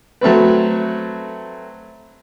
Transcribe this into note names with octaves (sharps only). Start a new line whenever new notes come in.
F#3 A3 C4 B4